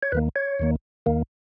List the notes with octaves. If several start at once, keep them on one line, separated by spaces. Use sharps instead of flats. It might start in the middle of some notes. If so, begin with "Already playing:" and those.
C#5
D#2 D#3 A#3 B4
C#5
D#2 D#3 A#3
D#2 D#3 A#3